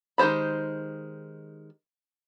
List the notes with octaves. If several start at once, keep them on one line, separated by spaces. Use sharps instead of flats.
D#3 G#3 G4 C5 B5